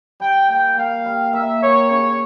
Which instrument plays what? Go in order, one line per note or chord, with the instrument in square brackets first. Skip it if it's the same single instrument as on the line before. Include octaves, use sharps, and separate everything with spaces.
[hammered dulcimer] G3 [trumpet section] G5
[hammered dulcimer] A#3 [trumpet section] G5
[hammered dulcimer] A#3 [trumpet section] F5
[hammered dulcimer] G3
[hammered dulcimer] A#3 [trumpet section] E5
[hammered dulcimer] A#3 [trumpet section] C#5
[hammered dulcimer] C#3 [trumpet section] C#5